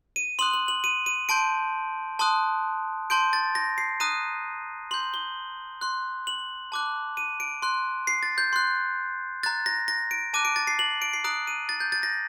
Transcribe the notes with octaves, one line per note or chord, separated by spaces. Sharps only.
D#7
C6 D#6 F#6 F#7
F#7
F#7
D#7
D#7
A5 C6 G6 D7
A5 C6 D#6 F#6
A5 C6 G6 D7
A6
A#6
C7
A#5 D#6 F#6 D#7
C6 G6 F#7
G7
C6 F#6
F#7
A5 D6 F#6
D#7
D7
C6 F#6
C7
A6
G6
C6 F#6
A#5 F#6 A6
A#6
A#6
D7
A5 D6 F#6 D#7
D7
A6
C7
F#7
D7
C7
A#5 D#6 F#6 D7
D#7
A6
G6
A6
A#6